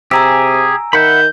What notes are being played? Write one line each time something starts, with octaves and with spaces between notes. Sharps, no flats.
C3 G4 G#4 G#5 A#5 E6
D#3 E5 F#5 B5 G6